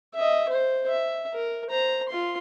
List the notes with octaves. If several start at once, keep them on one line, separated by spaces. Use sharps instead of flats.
D#5 E5
C5
E5
A#4
C5 A#5
F4 C6